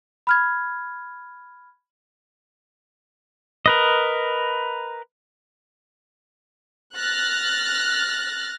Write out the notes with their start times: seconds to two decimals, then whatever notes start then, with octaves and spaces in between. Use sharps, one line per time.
0.27 B5 F6 G#6
3.66 A#4 B4 D#5
6.97 F6 F#6 A6 A#6